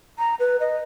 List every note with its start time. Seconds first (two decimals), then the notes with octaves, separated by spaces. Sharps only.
0.18 A#5
0.40 B4
0.60 D#5